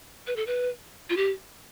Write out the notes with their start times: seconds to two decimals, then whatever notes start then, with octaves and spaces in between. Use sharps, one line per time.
0.27 B4
0.36 A4
0.47 B4
1.10 F4
1.17 G4